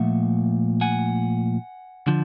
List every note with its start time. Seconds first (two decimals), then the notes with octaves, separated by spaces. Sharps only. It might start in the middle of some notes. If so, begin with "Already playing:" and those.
Already playing: A#2 F3 A3 E5 F#5
0.81 F#5 G#5
2.07 D3 F3